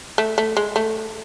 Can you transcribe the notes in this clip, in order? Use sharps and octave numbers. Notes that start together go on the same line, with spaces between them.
A3
A3
G#3
A3